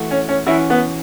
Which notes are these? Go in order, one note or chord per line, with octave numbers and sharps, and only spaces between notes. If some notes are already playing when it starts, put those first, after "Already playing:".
Already playing: E3 A3 F#4
C#4
C#4
E3 C#4 E4 F#4
B3